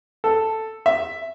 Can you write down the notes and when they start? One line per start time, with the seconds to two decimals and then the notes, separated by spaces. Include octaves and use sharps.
0.24 A4
0.86 E5